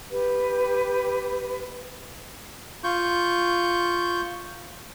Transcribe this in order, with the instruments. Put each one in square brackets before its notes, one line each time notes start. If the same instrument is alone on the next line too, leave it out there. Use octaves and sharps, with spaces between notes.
[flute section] G4 B4
[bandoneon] F4 C#6 G6